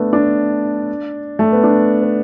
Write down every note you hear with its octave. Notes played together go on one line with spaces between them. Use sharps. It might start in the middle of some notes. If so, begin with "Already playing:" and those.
Already playing: A3 B3 D4
D4
A3
B3
D4
B3